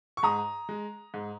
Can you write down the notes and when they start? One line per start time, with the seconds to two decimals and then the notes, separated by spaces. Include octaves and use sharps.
0.17 C#6
0.23 G#2 A#5 D#6
0.69 G#3
1.14 G#2